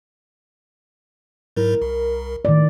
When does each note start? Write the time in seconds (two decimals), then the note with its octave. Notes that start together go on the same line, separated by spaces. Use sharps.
1.56 G#2 F#3 E4 A#4
1.82 C2
2.45 A2 D#3 D5